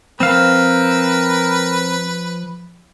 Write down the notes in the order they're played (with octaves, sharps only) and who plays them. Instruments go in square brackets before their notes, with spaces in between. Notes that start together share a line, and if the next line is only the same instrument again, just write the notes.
[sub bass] F3 [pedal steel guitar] C4 F5 [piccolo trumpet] A#4 [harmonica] B4